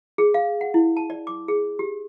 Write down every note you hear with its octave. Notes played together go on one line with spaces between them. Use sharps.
G#4
F5
F#5
E4
A5
D5
D6
G#4
G4